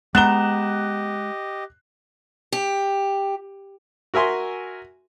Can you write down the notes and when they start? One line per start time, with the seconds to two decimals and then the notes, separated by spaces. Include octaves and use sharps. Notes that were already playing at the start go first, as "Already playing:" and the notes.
0.15 G#3 B3 G4 D#5 A#5 F#6 E7 G7
2.52 G4
4.14 F#4 A#4 E5 G#5 C6